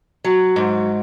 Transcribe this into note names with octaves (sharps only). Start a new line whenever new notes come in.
F#3
G#2